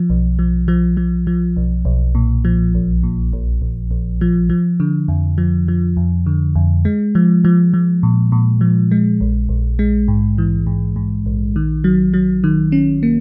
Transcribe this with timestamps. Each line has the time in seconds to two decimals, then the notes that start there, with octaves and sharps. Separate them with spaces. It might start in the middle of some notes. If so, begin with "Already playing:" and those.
Already playing: F3
0.10 B1
0.39 F3
0.68 F3
0.97 F3
1.27 F3
1.57 B1
1.85 B1
2.15 A#2
2.45 F3
2.74 A#1
3.03 A#2
3.33 A#1
3.62 A#1
3.91 A#1
4.21 F3
4.50 F3
4.80 D3
5.08 F2
5.38 F3
5.68 F3
5.97 F2
6.26 D3
6.55 F2
6.85 G#3
7.15 F3
7.45 F3
7.74 F3
8.03 A#2
8.32 A#2
8.61 F3
8.91 G#3
9.21 A#1
9.49 A#1
9.79 G#3
10.08 G#2
10.38 E3
10.66 G#2
10.96 G#2
11.26 A#1
11.56 D#3
11.84 F#3
12.14 F#3
12.44 D#3
12.72 C#4
13.03 A#3